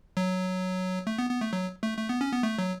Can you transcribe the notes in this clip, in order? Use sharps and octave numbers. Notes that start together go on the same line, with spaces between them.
F#3
A3
B3
B3
A3
F#3
A3
A3
B3
C#4
B3
A3
F#3